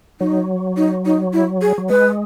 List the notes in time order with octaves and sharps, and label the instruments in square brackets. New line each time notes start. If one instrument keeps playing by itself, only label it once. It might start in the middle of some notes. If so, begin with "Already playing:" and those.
[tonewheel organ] F#3 [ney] D#4
[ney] D#4
D#4
E4
G#4
[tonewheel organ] F#3
[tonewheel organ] G#3 [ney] B4